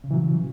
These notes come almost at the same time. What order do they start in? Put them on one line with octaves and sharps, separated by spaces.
C#3 A#2 E3 F#3